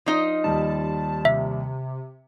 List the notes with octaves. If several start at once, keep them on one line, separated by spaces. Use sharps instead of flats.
F3 D#4 D#5
D#2 G3 A5
C3 E5